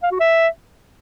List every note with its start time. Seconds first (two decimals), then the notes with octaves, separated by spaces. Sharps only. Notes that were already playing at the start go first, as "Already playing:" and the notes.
0.03 F5
0.11 F#4
0.20 E5